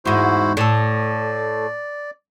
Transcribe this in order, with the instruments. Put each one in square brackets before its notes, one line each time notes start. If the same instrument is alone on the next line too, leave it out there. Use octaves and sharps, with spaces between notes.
[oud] E2 G#2 [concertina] E4 F#4 C5
[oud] A2 A4 [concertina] D5